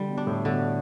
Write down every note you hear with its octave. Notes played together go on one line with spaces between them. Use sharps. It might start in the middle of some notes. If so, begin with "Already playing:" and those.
Already playing: D3 G3
B2
D4
A2
B2 D3